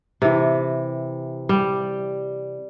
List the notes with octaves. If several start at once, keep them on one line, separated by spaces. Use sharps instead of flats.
C3 E3
G3